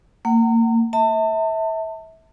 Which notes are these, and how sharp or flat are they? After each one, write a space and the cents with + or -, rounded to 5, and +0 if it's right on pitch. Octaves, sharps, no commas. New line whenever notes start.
A#3 -30 F#5 +30
E5 -30 A5 +35